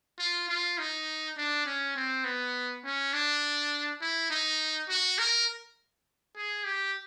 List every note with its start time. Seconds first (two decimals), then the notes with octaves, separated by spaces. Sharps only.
0.19 F4
0.49 F4
0.78 D#4
1.37 D4
1.66 C#4
1.96 C4
2.25 B3
2.84 C#4
3.13 D4
4.01 E4
4.30 D#4
4.89 F#4
5.19 A#4
6.37 G#4
6.66 G4